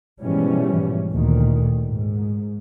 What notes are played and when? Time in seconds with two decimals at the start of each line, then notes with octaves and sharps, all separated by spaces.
0.22 G#2 B2 E3 F3 G3 C#4
1.11 D2 A#2 D#3
1.85 G#2